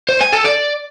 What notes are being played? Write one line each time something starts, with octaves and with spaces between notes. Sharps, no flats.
C5
G#5
A4
D5